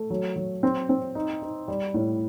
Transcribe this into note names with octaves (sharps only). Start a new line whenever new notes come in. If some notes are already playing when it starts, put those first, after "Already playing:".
Already playing: A3
F#3
F#3
C4
C4
D#4
D#4
G3
A2